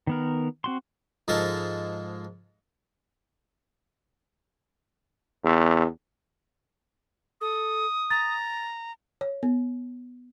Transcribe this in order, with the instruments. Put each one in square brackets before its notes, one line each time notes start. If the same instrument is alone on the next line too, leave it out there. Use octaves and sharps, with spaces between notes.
[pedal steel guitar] D#3 B3 A#4
C4 F#4 C6
[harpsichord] G#2 F3 G#3 A4 A#4 A5
[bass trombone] E2
[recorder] A4 [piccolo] D#6
[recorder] A#5 [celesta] A6
[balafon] C#5
B3